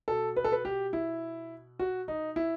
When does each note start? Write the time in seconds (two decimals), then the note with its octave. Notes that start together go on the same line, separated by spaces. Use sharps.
0.08 B2 A4
0.36 B4
0.44 A4
0.52 B4
0.65 G4
0.93 E4
1.80 F#4
2.08 D#4
2.36 E4